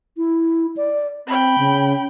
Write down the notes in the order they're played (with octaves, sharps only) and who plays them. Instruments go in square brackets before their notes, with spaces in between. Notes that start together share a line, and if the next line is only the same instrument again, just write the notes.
[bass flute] E4
D5
[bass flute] C4 [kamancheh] G5 B5
[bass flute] C#3